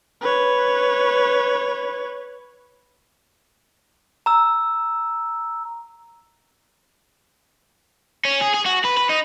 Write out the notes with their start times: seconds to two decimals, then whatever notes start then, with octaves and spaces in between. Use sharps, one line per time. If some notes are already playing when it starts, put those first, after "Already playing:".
0.22 B4 C#5
4.26 A#5 E6
8.25 C#4
8.41 G#4
8.54 G#4
8.66 F#4
8.85 B4
8.97 B4
9.10 D#4